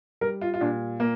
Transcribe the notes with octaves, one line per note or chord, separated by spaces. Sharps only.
G3 A#4
F4
F4
A#2 D4
A#2 A#3